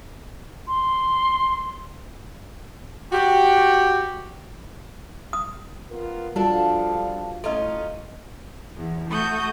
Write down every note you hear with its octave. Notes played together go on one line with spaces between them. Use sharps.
C6
F#4 G4
D#6
B3 F4 A#4
G2 F3 G3 D4 F4 F#4 A4 F5
A2 C#4 D#4 F4 A4 D#5
E2 B3
A3 F#4 C#6 D#6 G6